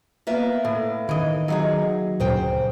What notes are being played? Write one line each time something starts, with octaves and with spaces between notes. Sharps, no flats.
A#3 B3 E5
A2
D#3 E3 D#5
F#3 D#4 G#4
D1 G2 A#2 C#3 C5 G5